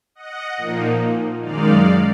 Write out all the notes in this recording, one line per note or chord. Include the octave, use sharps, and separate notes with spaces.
D#5 F#5
A#2 F3 A#3 D#4
F#2 D#3 G#3 D#4 D5 F5